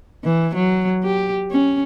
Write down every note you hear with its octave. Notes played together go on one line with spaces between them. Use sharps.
E3
F#3
G4
C#4